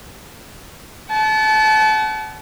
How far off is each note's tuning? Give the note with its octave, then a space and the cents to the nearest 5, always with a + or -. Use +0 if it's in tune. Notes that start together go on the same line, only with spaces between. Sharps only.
F#5 +35 A5 -25